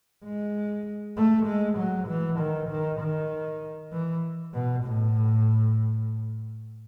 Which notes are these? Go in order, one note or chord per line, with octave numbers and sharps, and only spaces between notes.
G#3
A3
G#3
F#3
E3
D#3
D#3
D#3
E3
B2
A2